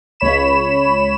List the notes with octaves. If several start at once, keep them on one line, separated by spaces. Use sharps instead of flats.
C#2 C#5 B5 E7